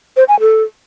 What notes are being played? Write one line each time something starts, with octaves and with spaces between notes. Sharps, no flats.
C5
G#5
A4